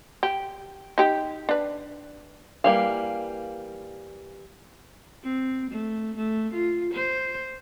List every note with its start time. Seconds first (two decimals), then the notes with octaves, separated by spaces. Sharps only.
0.23 G4
0.98 D#4 G4 G5
1.49 D4 B4
2.64 E3 G3 A#3 F5
5.23 C4
5.70 A3
6.17 A3
6.54 F4
6.93 C5